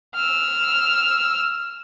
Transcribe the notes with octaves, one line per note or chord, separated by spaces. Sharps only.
E6 F6